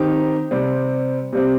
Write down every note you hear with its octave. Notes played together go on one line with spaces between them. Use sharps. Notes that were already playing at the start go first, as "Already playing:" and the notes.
Already playing: D#3 C4 D#4 G4
C3 G3 C4
C3 G3 C4